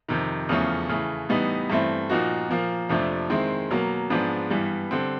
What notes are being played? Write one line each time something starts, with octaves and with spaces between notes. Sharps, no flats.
F2 C3 D#3
E2 C#3 F3 A3 C#4
C#3 E3 A3
A2 E3 G3 B3 D#4
G2 E3 A3 C4
A#2 F3 A#3 D#4 F#4
A#2 F3 A#3
F2 C3 F3 A3 D4
D#3 G#3 C4 E4
B2 F#3 A#3
G#2 F3 G#3 B3 D4
G2 E3 G3 B3
D3 G3 C4